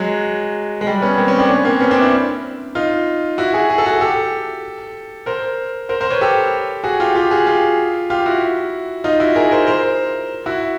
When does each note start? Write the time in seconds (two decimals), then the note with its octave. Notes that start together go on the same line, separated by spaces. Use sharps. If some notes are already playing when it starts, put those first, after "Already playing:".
Already playing: F#3 G#3
0.81 G#3
0.87 G3
1.02 B3 C#4
1.17 A#3 C4
1.28 B3 C#4
1.39 C4 D4
1.49 B3 C#4
1.65 A#3 C4
1.80 B3 C#4
1.91 C4 D4
2.01 D4 E4
2.75 D#4 F4
3.38 E4 F#4
3.53 F#4 G#4
3.70 G#4
3.78 A4
3.86 F#4 G#4
4.01 G4 A4
5.26 A#4 C5
5.89 A#4 C5
6.00 A#4 C5
6.11 B4 C#5
6.21 G4 A4
6.84 F#4 G#4
7.00 F4 G4
7.15 F4 G4
7.31 F#4 G#4
7.47 F4 G4
8.10 F4 G4
8.26 E4 F#4
9.04 D#4 F4
9.20 E4 F#4
9.36 G#4 A#4
9.51 A#4 C5
9.67 A#4 C5
10.46 E4 F#4